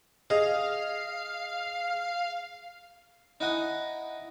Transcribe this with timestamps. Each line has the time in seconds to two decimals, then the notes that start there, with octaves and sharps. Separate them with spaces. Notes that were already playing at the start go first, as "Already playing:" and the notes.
0.30 G#4 D#5 F5
3.40 D#4 E4 D#5 F#5 G#5 D#6